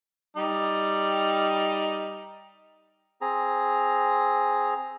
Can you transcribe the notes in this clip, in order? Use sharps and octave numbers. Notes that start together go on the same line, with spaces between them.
G3 D#4
C4 G#4 A#5